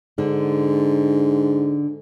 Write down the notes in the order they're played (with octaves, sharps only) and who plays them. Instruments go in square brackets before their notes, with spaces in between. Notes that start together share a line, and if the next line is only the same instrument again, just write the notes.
[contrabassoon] G#2 [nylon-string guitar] D3